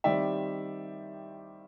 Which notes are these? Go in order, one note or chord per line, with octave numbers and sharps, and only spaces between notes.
D#3 G3 C4 D5 E5